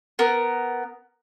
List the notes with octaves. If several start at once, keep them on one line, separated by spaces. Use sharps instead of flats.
B3 A#4